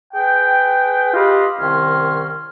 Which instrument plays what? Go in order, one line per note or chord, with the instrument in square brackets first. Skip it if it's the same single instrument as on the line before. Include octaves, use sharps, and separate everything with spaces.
[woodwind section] G#4 B4 G5
F4 G4 B4 D#5 F5
C2 D#3 C#4 C5 F6